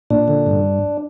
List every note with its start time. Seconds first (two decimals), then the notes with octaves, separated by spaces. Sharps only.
0.10 A#2 D4
0.28 D3
0.46 G2